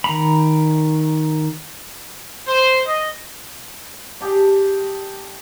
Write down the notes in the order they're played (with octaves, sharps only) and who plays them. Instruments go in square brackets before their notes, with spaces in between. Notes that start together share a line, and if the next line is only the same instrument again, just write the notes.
[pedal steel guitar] D#3 A#5 B5
[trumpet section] C5
D#5
[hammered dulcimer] D4 G4 G#4